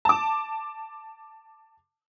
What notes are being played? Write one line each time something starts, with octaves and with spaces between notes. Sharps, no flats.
A5 D6